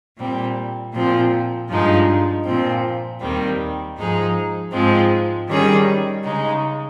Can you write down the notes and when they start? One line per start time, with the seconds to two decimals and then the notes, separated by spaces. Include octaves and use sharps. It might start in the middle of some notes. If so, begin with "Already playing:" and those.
0.17 A#2 G3 C4
0.94 A#2 F3 C4
1.69 G2 F3 G#3 D#4
2.45 A#2 F3 C4
3.20 D#2 D#3 G3 C4
3.97 G#2 F3 G#3 D#4 G#4
4.72 G#2 F3 G#3 C4
5.48 D#3 G3 C#4 G#4
6.24 C#3 G#3 D#4